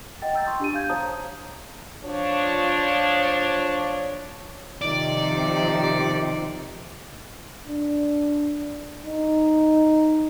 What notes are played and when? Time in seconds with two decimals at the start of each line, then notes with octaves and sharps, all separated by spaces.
0.22 D#5 F#5 G5 A6
0.33 G5 A#5 E6 G6 A6
0.46 G5 C6 C#6 D#6 E6
0.60 D4 G4 G#5 D#7
0.74 F5 G6 G#6
0.90 C5 C#5 F5 A5 A#5 D#6
2.04 F3 D4 C#5
4.81 C3 D#3 F3 D#4 D5
7.68 D4
9.07 D#4